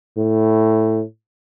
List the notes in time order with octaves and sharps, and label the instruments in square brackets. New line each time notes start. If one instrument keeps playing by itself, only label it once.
[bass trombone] A2